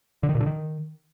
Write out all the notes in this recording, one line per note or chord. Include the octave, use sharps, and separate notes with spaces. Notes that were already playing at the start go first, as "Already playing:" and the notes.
D3
D#3
A#2
D3
D#3